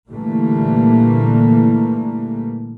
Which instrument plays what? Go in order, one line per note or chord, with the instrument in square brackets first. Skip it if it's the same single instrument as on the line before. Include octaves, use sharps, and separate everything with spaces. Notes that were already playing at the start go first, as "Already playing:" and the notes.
[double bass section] A#2 D3 E3 G3 A3 A#3